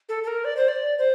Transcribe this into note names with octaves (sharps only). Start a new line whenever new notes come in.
A4
A4
A#4
D5
C5
D5
C5